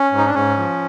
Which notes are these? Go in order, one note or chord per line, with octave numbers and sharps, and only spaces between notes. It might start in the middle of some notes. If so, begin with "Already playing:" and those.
Already playing: C#4
G#2
D#4
D4
G#2 C#4
F3